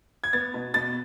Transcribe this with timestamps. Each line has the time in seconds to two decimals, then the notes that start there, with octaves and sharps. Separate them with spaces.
0.24 G#6
0.33 B3 A6
0.54 B2
0.74 B2 A6